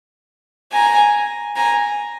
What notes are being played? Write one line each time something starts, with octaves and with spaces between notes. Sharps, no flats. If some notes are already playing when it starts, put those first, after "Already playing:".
G#5 A#5
G#5 A#5